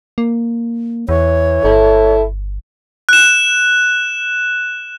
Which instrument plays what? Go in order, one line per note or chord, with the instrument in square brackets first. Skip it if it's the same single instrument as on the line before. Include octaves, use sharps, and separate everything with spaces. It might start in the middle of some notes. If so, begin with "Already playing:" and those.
[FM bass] A#3
[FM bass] E2 [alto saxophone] E3 [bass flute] C#5
[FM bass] G1 [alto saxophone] E4 [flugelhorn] A4
[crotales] F#6 E7